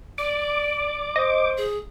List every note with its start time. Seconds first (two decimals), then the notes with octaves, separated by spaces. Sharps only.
0.18 D5 D6
1.16 C5 D#5
1.57 G#4